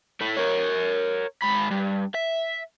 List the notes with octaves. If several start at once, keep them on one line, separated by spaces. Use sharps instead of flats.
A3 E4
A#4 C#5
G#2 B5
G2
E5